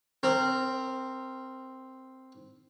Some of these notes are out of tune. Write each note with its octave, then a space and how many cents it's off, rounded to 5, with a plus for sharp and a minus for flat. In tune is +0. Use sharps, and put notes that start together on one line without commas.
C4 +0 A#4 -20